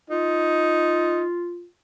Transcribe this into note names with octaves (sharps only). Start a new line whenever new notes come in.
D#4 F4